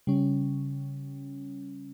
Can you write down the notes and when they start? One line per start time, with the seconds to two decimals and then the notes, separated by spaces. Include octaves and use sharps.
0.07 C#3 G3 C#4